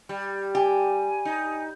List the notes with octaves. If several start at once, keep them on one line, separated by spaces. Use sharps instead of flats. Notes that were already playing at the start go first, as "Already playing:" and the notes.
G3
G4 G#5
D#4